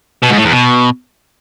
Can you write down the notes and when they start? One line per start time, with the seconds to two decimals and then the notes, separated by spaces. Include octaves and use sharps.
0.23 B2
0.30 G#2
0.37 A2
0.45 E2
0.52 B2